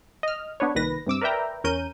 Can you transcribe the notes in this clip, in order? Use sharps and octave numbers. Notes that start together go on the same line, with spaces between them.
D#5 F6
B3 D4 B4 C#5
C2 A#2 D#3 B4 A#6
G2 C3 D6 E6
A#4 B4 D5 E5 G5 A#5
E2 C#4 A#4 G6 D#7